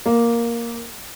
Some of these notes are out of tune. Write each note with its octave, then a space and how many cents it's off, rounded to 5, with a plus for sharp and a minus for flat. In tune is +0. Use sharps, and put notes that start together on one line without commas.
A#3 +5